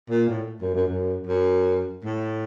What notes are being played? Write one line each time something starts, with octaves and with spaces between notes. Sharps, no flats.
A#2
A2
F#2
F#2
F#2
F#2
A2